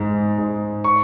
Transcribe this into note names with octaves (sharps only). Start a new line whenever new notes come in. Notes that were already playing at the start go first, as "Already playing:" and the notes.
Already playing: G#2 G#3
G#2
C#6